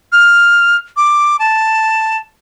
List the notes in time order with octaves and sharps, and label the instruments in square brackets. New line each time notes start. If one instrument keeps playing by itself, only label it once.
[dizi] F6
D6
A5